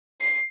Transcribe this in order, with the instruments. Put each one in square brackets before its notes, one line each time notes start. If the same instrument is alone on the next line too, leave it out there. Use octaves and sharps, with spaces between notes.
[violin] C7